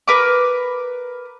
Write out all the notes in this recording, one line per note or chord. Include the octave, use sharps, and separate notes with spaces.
A#4 B4 D6